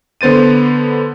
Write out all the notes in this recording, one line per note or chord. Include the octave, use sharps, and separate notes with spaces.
D3 B3 C5 A6 D#7